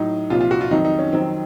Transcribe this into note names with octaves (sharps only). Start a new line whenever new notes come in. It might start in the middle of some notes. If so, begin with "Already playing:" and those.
Already playing: A2 F#3 D#4
C2 A#2 F3 F4
F4
F#4
F4
F2 D#3 F#3 D#4
D#4
C#4
F2 D#3 F#3 C4